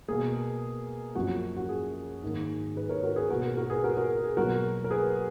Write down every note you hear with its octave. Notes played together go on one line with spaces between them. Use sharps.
B2 A#3 G#4
F#2 F3 A#3 F#4
F#4
G#4
G#2 D#3 A#3
G#4 B4
A#4 C#5
F#4 A#4
G#4 B4
B2 A#3 F#4 A#4
F#4 A#4
G#4 B4
F#4 A#4
F#4 A#4
G#4
G#4
B2 F#3 A#3 F#4 A#4
A#4
G#4 B4